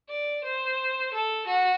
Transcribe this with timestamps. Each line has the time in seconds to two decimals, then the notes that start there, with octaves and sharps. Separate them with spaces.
0.09 D5
0.44 C5
1.13 A4
1.46 F#4